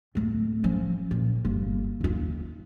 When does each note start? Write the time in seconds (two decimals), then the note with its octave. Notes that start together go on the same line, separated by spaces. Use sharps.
0.15 D1 A3
0.64 F3 C#4
1.11 A#2
1.45 G1 A#3
2.01 D#2 F4